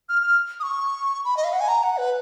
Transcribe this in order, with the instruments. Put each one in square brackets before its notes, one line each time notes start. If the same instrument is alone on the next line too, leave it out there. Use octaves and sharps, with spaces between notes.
[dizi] F6
F6
D#6
C#6
B5
D#5
F5
F#5
G#5
A#5
F#5
B4